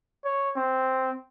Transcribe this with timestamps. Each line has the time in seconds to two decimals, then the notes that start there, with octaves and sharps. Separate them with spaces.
0.25 C#5
0.56 C4